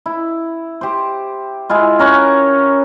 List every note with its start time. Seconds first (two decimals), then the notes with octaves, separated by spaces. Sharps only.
0.06 E4
0.81 G4 C5
1.69 G#3 E4 F4
1.99 C#4 A#4 C#5 F#5